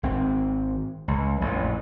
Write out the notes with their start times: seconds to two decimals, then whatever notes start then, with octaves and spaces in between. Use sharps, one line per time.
0.03 G#1 C4
1.08 C#2
1.41 A1 F2 A#2